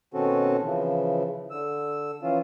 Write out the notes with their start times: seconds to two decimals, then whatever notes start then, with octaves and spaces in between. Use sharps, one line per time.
0.14 B2 D#3 C4 C#4 F#4 A4
0.63 C#3 E3 F3
1.51 D3 E6
2.22 E3 F3 C#4 F4